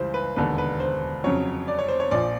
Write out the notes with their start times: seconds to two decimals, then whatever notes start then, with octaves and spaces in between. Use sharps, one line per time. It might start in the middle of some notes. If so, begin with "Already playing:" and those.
Already playing: C#2 E3 G3 C5
0.14 B4
0.36 E1 D#2 D3 B4
0.58 B4
0.80 C5
1.24 F2 C#3 F#3 C#5
1.68 D5
1.79 C#5
1.88 C5
2.00 C#5
2.11 A#1 A#2 F3 D5